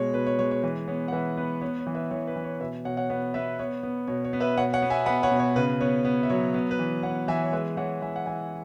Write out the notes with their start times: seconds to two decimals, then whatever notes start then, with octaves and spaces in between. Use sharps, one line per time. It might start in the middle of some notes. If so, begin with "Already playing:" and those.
Already playing: B2 G#3 C#5
0.14 B2 B4
0.26 C#5
0.39 G#3 C#5
0.51 C#5
0.63 E3 B4
0.88 B3 C#5
1.08 F#5
1.12 E3 B4 E5
1.37 B3 B4
1.61 B3 C#5
1.78 C#5
1.87 E3
1.95 B4 E5
2.11 E3 C#5
2.27 B4
2.36 E3
2.44 C#5
2.60 B2 B4 E5
2.85 B2 C#5 F#5
2.97 C#5 F#5
3.09 B3 C#5 F#5
3.34 B3 B4 E5
3.59 B3 C#5
3.83 B3
4.07 B2 C#5
4.25 C#5
4.33 B3
4.40 B4 E5
4.57 B2 C#5 F#5
4.73 C#5 F#5
4.82 B3
4.90 E5 G#5
5.06 B3 F#5 B5
5.23 C#5 F#5
5.31 B2
5.39 C#5
5.56 C#3 B4
5.80 B3 C#5
6.05 B3
6.23 E5
6.30 F#3 C#5
6.54 B3
6.71 B4
6.79 E3
7.03 B3 C#5 F#5
7.28 E3 E5 G#5
7.43 C#5
7.53 G#3 B4 E5
7.77 E3 C#5 F#5
8.02 E3 E5 G#5
8.16 F#5
8.26 E3 E5 G#5